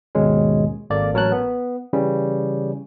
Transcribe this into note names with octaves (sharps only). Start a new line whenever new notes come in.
D#2 G#2 B2 D#3 G#3 C#4
G#1 A#3 A4 D5
A1 F#3 A#4 C#5 A5 F#6
B3
C#3 E3 G3 C#4